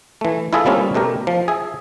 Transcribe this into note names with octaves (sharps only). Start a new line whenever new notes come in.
E3 A3
E4 F4 G#4 A4 E5
G3 A3 A#3 C4 C#4 F4
B2 A3 G4 A#4
F3
G#4 E5